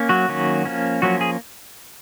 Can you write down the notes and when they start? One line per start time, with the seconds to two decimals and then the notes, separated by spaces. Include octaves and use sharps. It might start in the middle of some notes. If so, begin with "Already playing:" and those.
Already playing: A#3 C#4
0.09 F#3 F#4
0.29 D#3 F#3 A#3 C#4
0.65 F3 A#3 C#4
1.02 F3 F#3 A#3 C#4 F#4
1.21 G#4